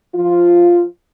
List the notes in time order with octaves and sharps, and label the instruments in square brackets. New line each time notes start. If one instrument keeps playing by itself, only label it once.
[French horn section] F3 F4